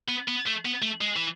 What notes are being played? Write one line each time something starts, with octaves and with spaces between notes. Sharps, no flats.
B3
B3
A3
B3
A3
G#3
E3